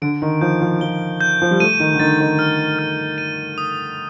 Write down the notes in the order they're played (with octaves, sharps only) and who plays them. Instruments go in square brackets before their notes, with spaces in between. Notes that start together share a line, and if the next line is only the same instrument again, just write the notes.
[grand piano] D3 [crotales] D7
[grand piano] D#3
[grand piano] F3 [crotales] G6
[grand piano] F3
[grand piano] F3 [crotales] G7
[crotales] G6
[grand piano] F3
G3
[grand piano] A3 [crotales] D#7
[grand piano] D#3
D3
[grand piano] D#3 [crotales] A6
[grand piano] D#3
[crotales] F6
F6
D#7
D#6